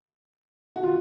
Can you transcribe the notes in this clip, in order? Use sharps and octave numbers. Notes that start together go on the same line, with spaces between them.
F#4
F4